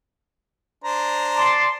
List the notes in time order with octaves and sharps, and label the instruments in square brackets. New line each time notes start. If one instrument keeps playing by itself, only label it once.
[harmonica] D4 C5 A#5
[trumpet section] D5 A5 C6